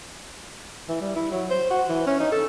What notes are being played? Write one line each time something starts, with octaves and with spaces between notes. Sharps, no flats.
E3
G3
E4
F#3
C5
F#4
E3
C#4
D#4
A4